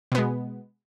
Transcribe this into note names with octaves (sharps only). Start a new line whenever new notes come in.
B2 G#3 B3